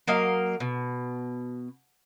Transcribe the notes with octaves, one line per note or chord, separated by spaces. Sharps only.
F#3 A#3 D#5 F5
B2